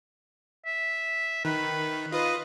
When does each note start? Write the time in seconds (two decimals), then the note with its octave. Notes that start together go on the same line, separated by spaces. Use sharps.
0.66 E5
1.45 D#3 B4
2.12 F4 B4 D#5